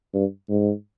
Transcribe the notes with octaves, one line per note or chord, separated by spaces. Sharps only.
G2
G#2